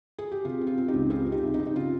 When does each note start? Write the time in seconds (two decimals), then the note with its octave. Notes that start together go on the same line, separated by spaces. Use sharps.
0.18 G#4
0.32 G4
0.45 C3 F4
0.61 C4
0.67 F4
0.78 C4
0.88 D#4 G4
0.94 C#2
1.10 C4 F4 G#4
1.26 C4
1.32 D#4 G4
1.43 C2
1.54 D#4
1.59 C4
1.66 D#4
1.75 C#3 F4